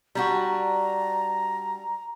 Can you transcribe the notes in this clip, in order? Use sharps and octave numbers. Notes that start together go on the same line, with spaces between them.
G3 D4 F#4 A#5